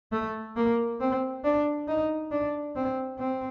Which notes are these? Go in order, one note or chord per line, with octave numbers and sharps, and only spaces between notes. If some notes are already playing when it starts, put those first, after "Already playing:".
A3
A#3
C4
D4
D#4
D4
C4
C4